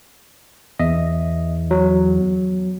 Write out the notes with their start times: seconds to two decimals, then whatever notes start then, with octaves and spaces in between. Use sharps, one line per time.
0.79 E2 D#5 E5
1.71 F#3